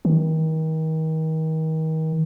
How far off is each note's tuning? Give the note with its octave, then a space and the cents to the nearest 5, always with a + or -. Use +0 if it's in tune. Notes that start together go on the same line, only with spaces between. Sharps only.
D#3 +35